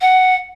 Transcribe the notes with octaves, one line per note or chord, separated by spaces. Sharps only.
F#5